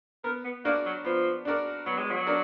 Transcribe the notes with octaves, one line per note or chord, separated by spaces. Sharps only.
B3 A#4
B3
A#3 D4 F#4 A#4 D5
F#3
F3 B3
D4 F#4 A#4 D5
F#3 B3
G#3
F#3
D4 F#4 A#4 D5